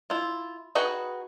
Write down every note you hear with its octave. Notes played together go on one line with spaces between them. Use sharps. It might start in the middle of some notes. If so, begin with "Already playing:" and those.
E4 F4
D#4 F#4 G#4 B4 G5